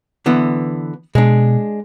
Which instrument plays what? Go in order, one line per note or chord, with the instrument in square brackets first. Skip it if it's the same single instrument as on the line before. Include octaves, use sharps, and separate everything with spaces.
[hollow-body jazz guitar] D3 E3 B3
[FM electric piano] B2 [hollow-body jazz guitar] G#3 D4